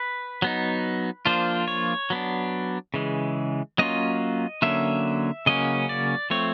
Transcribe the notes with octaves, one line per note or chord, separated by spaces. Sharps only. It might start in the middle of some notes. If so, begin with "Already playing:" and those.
Already playing: B4
F#3 B3 D#4
F3 A#3 D4 F4 C5
C#5
F#3 B3 D4
C#3 E3 G#3
F#3 A#3 C#4 F4 D#5
D3 F#3 A#3 C#4 E5
C#3 F#3 A#3 C#4 D#5
D5
F3 A3 C4 C#5